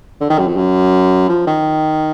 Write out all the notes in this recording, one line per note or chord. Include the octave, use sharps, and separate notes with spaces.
D3
D#3
F#2
F2
F#2
F3
D#3